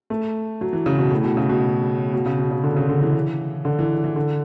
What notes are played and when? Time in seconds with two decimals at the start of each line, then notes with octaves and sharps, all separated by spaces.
0.10 A3
0.61 F#3
0.73 E3
0.86 C#3
0.98 B2
1.11 A2
1.24 B2
1.37 C#3
1.49 B2
2.13 B2
2.26 C#3
2.39 B2
2.51 C#3
2.63 D3
2.77 C#3
2.89 D3
3.01 E3
3.65 D3
3.79 E3
4.04 E3
4.16 D3